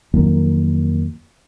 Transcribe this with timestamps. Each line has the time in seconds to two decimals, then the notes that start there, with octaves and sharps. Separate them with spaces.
0.14 F2 D#3 F#3 A#3